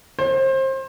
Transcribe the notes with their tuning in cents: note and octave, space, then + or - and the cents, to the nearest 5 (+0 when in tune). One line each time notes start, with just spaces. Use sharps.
C5 +30